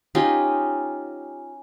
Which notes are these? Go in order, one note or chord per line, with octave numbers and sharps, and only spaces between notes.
C#4 D#4 F4 G4